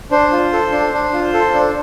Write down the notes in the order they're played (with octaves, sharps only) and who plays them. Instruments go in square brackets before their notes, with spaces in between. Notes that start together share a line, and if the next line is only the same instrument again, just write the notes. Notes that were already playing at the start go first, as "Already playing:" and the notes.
[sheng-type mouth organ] D4 C5
F4
A4
D4
D4
F4
A4
D4